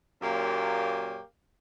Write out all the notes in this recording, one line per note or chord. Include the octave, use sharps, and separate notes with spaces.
F#2 A#2 A#3 G4 C#5